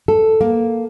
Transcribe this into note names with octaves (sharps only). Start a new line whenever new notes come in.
A4
A#3